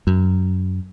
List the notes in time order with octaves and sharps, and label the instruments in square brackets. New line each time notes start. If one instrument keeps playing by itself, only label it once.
[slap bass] F#2